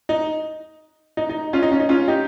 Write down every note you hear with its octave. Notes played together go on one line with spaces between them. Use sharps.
D#4
D#4
D#4
C#4 F4
D#4
C#4
D#4
C#4 F4
D#4 G4